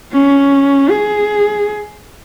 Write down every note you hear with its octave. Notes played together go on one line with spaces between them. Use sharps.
C#4
G#4